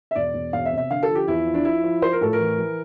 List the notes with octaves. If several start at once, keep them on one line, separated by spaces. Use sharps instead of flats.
E5
E1 D5
E1
E1 F5
E5
C3
E5
D3 F5
A4
F3
G4
E2 E4
F3
D4
F3 E4
F3
F3 C5
A#4
A2 A4
A#4
E3
E3